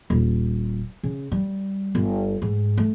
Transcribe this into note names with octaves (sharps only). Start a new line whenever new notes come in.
D#1
C#3
G3
G1
G#2
A3